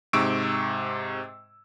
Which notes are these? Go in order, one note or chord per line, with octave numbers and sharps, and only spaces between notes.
G#2 C3 C#6 E6 D7